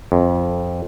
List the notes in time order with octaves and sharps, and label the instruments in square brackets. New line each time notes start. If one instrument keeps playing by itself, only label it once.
[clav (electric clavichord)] F2